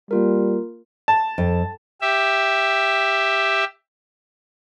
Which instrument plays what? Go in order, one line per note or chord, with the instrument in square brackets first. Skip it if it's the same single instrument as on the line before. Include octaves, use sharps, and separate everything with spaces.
[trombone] G3 [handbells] A#3 F4 A#4
[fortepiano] A5
[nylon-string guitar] F2
[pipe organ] G4 E5